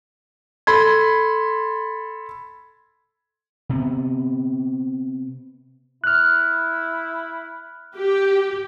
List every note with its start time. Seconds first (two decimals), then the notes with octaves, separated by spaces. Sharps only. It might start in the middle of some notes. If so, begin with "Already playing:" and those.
0.67 A4 B5 C6 G#6
3.69 C3 B3
6.04 E4 F6 F#6
7.96 G4